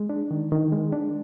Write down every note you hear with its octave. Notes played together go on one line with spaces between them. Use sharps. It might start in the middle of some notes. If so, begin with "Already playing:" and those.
Already playing: G#3
D4
D#3
D#3
G#3
D4